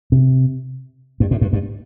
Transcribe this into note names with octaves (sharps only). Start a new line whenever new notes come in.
C3
G2
A2
G2
G2